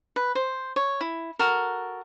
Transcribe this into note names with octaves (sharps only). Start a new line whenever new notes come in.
B4
C5
C#5
E4
F#4 A4 A#4